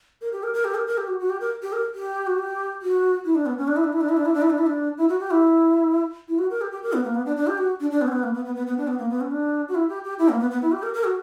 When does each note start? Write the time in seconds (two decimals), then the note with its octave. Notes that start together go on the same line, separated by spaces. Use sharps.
0.21 A#4
0.33 G4
0.43 A#4
0.54 A#4
0.65 G4
0.75 A#4
0.87 A#4
0.98 G4
1.08 F#4
1.19 F#4
1.30 G4
1.41 A#4
1.62 G4
1.73 A#4
1.95 G4
2.27 F#4
2.38 G4
2.82 F#4
3.25 E4
3.35 D4
3.46 B3
3.58 C#4
3.68 D4
3.76 E4
3.84 D4
3.93 E4
4.01 D4
4.09 E4
4.17 D4
4.25 E4
4.34 D4
4.42 E4
4.50 D4
4.58 E4
4.67 D4
4.98 E4
5.09 F#4
5.20 G4
5.31 E4
6.28 E4
6.39 F#4
6.50 A#4
6.61 G4
6.72 G4
6.83 A#4
6.93 B3
7.04 A#3
7.15 B3
7.26 D4
7.36 D4
7.47 G4
7.58 F#4
7.80 D4
7.91 D4
8.01 B3
8.08 C#4
8.12 B3
8.23 A#3
8.34 B3
8.45 B3
8.55 B3
8.67 B3
8.78 D4
8.88 B3
8.99 A#3
9.10 B3
9.21 C#4
9.31 D4
9.68 F#4
9.75 E4
9.89 G4
10.04 G4
10.19 E4
10.29 A#3
10.40 B3
10.51 B3
10.62 E4
10.72 G4
10.83 A#4
10.94 A#4
11.04 F#4